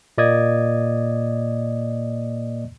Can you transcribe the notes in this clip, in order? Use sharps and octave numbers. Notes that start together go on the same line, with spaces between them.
A#2 A#3 D5 D#5 D#6 G#6